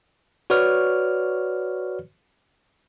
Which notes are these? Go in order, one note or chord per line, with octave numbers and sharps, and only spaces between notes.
F#4 B4 C#5 D5 F6